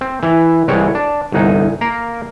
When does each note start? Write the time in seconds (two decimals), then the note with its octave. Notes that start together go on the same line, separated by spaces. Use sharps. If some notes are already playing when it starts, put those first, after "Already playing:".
0.01 C4
0.23 E3 E4
0.68 C2 E3 G#3 C#5 G5
0.95 D4
1.32 G1 C2 D#4 F#5 G#5
1.81 A#3 A#4 F5